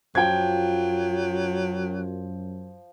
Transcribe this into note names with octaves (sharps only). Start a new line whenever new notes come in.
F#2 F3 F#3 G5 G#6